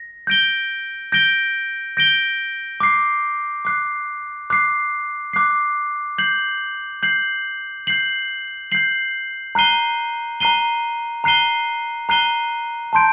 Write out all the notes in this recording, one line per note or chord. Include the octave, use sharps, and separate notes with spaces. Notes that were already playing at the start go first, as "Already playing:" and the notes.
Already playing: A#6
G6 A#6 D7 G7
G6 A#6 D7 G7
G6 A#6 D7 G7
D6 F#6 C7
D6 F#6 C7
D6 F#6 C7
D6 F#6 C7
G6 C7 F#7
G6 C7 F#7
G6 C7 F#7
G6 C7 F#7
A#5 F#6 C7 D#7 G7
A#5 F#6 C7 D#7 G7
A#5 F#6 C7 D#7 G7
A#5 F#6 C7 D#7 G7
A5 C6 G6 D7